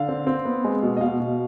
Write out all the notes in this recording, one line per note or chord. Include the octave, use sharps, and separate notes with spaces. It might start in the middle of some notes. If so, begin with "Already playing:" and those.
Already playing: D3 F5
C4
C4
B3
G#3
B2
D#5
B2 F5
B2